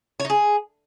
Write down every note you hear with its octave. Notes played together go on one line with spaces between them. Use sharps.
C#5
D#4
G#4